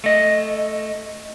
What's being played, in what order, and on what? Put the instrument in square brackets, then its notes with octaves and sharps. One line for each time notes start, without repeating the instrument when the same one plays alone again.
[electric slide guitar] A3 D#5